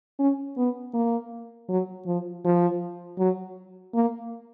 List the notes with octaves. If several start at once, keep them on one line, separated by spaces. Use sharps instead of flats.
C#4
B3
A#3
F#3
F3
F3
F#3
A#3